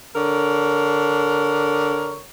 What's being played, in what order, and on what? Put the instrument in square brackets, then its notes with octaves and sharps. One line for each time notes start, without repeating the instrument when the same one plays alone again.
[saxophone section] D3 A#4 C#5